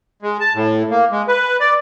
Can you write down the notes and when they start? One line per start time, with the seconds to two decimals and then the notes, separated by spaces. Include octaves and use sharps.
0.22 G#3
0.40 A5
0.54 A2
0.91 A#3
1.11 G#3
1.28 B4
1.60 D5